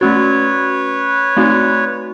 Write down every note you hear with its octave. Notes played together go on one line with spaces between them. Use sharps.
A3 C#4 F#4 B4 C#5
A3 C4 D#4 F#4